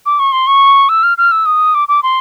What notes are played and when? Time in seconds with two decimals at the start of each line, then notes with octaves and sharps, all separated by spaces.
0.06 D6
0.19 C#6
0.32 C6
0.47 C#6
0.89 E6
1.03 F6
1.18 F6
1.31 E6
1.46 D#6
1.75 D6
1.88 D6
2.03 C6